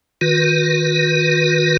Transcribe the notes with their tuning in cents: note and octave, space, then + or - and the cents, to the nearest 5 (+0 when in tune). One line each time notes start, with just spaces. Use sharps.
D#3 +0 F#4 -45 B4 -15